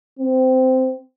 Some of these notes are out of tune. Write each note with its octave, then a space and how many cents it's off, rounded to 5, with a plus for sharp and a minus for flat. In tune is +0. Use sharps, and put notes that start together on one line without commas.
C4 -15